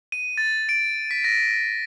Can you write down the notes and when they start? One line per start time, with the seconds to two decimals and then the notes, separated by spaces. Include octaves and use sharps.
0.12 D#7
0.38 A6
0.69 D7
1.11 B6
1.24 A#6